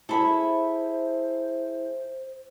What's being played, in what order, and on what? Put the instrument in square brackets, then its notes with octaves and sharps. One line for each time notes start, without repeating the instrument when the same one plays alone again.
[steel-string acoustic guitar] E4 G#4 E5 [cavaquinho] A4 B5 [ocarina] C5